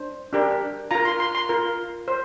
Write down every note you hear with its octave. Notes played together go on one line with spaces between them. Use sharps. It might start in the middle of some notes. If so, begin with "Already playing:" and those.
Already playing: D4 C5
D4 G4 A#4
F4 A#4 A#5
C6
C6
C6
F4 A#4
C5